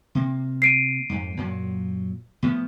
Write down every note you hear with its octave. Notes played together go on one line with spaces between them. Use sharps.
C3 A#3
C7 D7 D#7
F2 G#2
F#2 A#2 F#3
A2 F3 B3